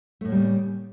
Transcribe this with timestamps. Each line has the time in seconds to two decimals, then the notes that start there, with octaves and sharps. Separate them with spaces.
0.21 A3
0.25 A2
0.28 A#3
0.32 G3
0.36 C#3